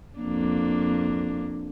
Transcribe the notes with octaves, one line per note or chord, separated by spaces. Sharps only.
F2 A#3 D4